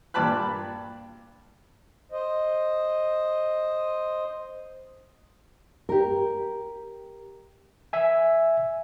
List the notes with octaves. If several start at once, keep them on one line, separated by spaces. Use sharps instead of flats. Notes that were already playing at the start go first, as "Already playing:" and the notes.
G2 A#2 D5 A5 B5 F#6
C5 D#5
G4 A#4
E5 G#5